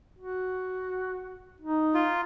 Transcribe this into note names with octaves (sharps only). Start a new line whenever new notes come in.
F#4
D#4
F4